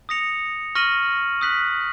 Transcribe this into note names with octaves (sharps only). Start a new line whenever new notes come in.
D#6 A#6 C#7 F7
C#6 F6 A#6 D#7 F#7
D#6 F#6 B6 F#7